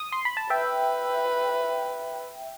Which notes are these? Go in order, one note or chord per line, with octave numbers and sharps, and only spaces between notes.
D#6
C6
B5
A5
B4 E5 G5